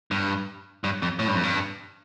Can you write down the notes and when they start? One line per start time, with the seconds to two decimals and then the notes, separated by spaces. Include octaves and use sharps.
0.11 G2
0.84 G2
1.02 F2
1.19 A2
1.28 G2
1.35 F2
1.44 G2